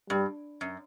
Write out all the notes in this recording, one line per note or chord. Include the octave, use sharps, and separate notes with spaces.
G2 G3
F#2